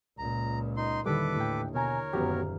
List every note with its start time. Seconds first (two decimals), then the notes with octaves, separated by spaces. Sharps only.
0.18 C#2 A#2 A#5
0.77 D#4 C6
1.06 D#2 D3 D#3 G3 E4 A4 B4 D6
1.36 A2 G5
1.75 B2 A#4 C#5 G#5 A#5
2.13 D#1 F#2 B3 F#4 G4 A#5 F6